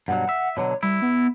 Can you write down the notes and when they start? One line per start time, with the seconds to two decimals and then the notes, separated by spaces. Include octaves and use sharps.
0.08 G2 B2 F#3 F#5
0.29 E5
0.57 B2 D3 F#3 C#5
0.83 G3 E4
1.02 B3